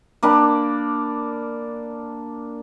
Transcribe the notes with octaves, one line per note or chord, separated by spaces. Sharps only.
A#3 D4 B5